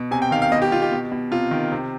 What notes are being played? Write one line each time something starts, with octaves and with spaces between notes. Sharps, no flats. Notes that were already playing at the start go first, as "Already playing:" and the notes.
Already playing: B2
C3 G#5
G5
D#3 F5
F5
B2 D#5
G4
B2 F4
G4
B2
B2
C3 F4
D#3
C3